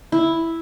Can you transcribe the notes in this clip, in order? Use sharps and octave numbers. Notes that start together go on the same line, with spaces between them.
E4